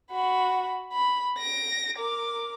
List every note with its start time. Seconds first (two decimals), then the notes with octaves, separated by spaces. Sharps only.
0.12 F#4 B5
0.93 B5
1.38 A#6 D7
1.97 A#4 D6